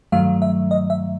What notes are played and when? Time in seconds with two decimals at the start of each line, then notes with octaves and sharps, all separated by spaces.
0.12 G2 D#3 F#3 A3 F5
0.42 E5
0.71 D#5
0.90 E5